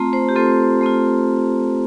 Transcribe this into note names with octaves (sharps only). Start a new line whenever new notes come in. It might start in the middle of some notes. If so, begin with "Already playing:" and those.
Already playing: A3 C4 F4 A#5
C5
G4
A3 C4 F4 A4
A3 C4 F4